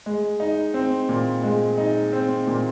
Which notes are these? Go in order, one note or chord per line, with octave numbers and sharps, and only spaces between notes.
G#3
D#4
C4
A#2
G#3
D#4
C4
A#2